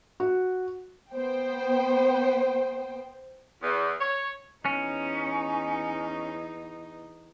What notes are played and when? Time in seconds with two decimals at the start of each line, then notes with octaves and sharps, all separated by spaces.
0.20 F#4
1.13 B3 C5 G5
3.63 E2
4.01 C#5
4.65 E2 C#4 D#4